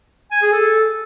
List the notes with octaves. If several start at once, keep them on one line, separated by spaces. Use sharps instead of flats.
G#5
G#4
A4